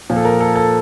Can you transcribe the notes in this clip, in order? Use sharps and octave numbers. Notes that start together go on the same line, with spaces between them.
A#2 F3
A4
A#4
A4
A4